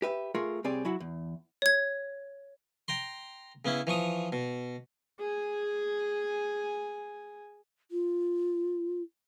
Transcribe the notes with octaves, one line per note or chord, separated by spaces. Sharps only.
G4 B4 E5
A3 F4 G#4 A#4
C2 C4 G4 G#4 C#5 D5
F#3 E4 F#4
E2
C#5 G#6
G5 A#5 C6
C#3 B3 C#4 E4
E3 F3 C#6 D#6
B2
G#4 G#5
F4